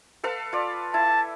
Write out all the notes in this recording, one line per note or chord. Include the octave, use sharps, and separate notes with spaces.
A4 B4 F5
F4 D5
E4 A5